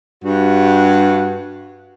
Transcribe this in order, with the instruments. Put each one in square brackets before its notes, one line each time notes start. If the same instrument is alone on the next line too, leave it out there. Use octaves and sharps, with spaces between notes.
[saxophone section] G2 F#4